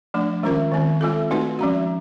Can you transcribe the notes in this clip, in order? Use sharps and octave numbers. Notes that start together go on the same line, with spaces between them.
F3 A3 D4
D#3 G#3 C#4 F4 A#4
D#3 G#3 C4
G#3 C4 F4 A4
A3 C4 D#4 F#4 B4
F3 G#3 C#4 F#4